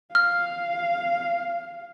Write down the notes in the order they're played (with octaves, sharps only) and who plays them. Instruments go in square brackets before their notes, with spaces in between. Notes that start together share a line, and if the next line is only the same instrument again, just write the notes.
[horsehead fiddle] F5 [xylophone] F6